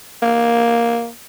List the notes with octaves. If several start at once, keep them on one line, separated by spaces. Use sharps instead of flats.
A#3